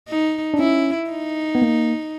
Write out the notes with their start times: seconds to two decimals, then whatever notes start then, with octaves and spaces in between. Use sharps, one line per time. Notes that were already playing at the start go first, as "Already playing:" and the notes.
0.09 D#4
0.54 D4
0.59 C#4 E4
1.10 D#4
1.55 B3
1.62 A#3